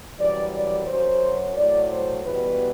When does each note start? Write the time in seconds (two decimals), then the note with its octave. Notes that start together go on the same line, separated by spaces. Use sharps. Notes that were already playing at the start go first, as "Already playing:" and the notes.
0.19 F#2 E3 G3 D5
0.53 D5
0.87 F#2 F#3 C5
1.56 A2 F#3 D5
1.90 C5
2.24 E2 B2 G3 B4